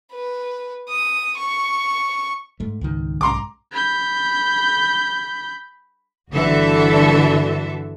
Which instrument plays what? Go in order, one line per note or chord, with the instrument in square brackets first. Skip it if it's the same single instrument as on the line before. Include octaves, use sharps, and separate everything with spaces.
[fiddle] B4
D#6
C#6
[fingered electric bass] G#2 A3
C#2 G#2 D#3
[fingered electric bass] B1 G#2 [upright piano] A#5 C6 D6
[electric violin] B5 G6
[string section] G1 D3 E3 F#4 A4 E5